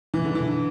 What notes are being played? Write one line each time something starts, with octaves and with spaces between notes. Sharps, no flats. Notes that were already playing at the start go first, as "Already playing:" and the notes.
E3
D3
E3